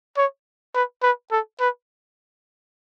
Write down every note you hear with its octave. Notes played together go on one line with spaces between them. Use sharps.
C#5
B4
B4
A4
B4